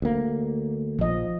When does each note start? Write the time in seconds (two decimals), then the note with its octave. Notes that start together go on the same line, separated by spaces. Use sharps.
0.02 D2 A#3
0.99 A#1 F3 D#5